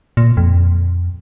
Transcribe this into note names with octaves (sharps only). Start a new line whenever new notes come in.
A#2
F2